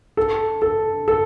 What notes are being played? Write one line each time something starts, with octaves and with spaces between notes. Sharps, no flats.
A4
A4
A4